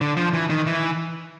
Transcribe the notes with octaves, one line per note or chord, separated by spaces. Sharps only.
D3
F3
E3
D#3
E3